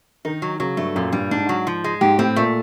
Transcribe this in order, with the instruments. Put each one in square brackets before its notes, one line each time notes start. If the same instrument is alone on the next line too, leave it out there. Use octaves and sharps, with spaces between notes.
[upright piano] D#3 [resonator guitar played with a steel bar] D#4
[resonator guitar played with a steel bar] F#3
[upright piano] C#3 [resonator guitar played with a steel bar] F#3
[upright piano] G2 [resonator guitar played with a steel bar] A3
[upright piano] F#2 [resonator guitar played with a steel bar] A#2
[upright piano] G2 [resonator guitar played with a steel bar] G3
[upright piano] G#2 [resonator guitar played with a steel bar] D4
[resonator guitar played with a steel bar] F#3
F3
G#3
[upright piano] G#2 [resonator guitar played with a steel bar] G4
[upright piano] A2 [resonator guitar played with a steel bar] C4
[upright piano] A#2 [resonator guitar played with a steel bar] A3